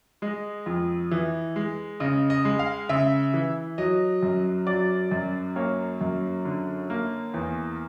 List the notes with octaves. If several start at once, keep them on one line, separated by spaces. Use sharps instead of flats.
G#3 D#5
F2
E3
G#3
C#3 D#5
D#5
G#3
F5
C#3 E5
E3
F#3 D#5
F#2
F#3 D5
F#2
A#3 C#5
F#2
D3
A#3
E2